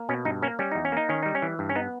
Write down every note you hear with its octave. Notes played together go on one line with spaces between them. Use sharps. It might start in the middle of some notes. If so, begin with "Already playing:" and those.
Already playing: A#3
B2 C#4
G2 D#4
A#3 C#4
G3 C#4
E2 D#4
C#4
A#3 D#4
D#3 C#4
G3 D#4
C#4
E3
G2
C#4
B3 D#4